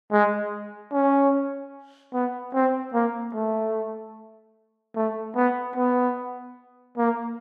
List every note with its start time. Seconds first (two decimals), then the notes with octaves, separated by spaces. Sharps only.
0.12 G#3
0.93 C#4
2.14 B3
2.54 C4
2.94 A#3
3.35 A3
4.96 A3
5.36 B3
5.76 B3
6.98 A#3